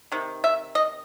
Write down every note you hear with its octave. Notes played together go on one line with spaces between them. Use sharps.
C3 D#3
E5
D#5